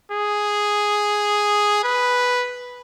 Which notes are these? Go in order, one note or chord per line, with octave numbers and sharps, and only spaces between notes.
G#4
B4